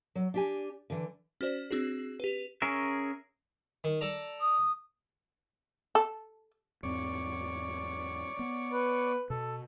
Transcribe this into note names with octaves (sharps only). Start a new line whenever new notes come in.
F#3
D4 G4 G#5
D3 E3
C#4 F#4 C5 D5
C4 D4 F#4 G#4
G4 B4
C#4 G#4 A#4 E5
D#3
A4 D5 A#5
D#6
A4
E2 G#2 C4 C#5 D5
B3
B4
B2 A4